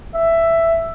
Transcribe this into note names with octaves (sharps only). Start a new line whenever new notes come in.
E5